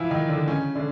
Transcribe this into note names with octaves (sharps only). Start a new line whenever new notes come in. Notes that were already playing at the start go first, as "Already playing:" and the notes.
Already playing: E3 F3 E4 F4
D#3 D#4
D3 D4
C#3 C#4
D3 D4